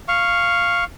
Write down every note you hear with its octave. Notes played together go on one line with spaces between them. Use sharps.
F5 C#6